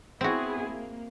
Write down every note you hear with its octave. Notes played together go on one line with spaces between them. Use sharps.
B3 C4 E4 F#4 G#4
A#3